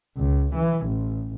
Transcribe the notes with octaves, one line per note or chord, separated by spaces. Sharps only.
C#2
E3
A1